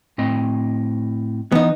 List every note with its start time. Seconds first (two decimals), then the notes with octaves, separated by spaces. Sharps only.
0.18 A2 C4 D#5
1.52 E3 B3 D#4